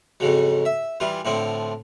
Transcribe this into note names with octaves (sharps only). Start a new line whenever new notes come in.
F2 G#2 C#3 F#3
E5
E3 G3 F4
A2 D3 F3 C4